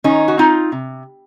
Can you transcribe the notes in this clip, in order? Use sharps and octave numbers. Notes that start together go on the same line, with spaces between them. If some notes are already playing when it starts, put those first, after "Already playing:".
D#3 C#4 D#4
F#4
C4 D#4 F4
C3